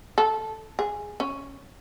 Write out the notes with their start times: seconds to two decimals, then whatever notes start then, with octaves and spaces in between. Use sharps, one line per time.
0.18 A4
0.79 G#4
1.20 C#4